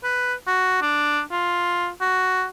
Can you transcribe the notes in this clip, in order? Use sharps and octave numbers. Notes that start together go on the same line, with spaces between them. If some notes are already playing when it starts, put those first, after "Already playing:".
B4
F#4
D4
F4
F#4